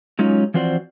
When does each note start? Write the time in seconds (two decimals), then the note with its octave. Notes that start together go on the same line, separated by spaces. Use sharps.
0.19 F#3 G#3 C#4 D#4 F4
0.54 E3 F3 C4 F#4 C5 D5